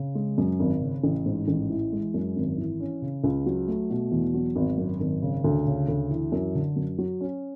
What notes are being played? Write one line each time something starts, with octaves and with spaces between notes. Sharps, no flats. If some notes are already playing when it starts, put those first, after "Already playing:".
Already playing: C#3
G#3
F#2
G#1
C#3
A1
G#2
A1
E3
G#3
F#2
G#1
E3
C#4
C#3
C#2
F#3
A3
B2
E2
F#3
G#1
F#2
G#1
C#3
D2
C#3
D2
E3
F#2
D3
F#2
F#3
C#4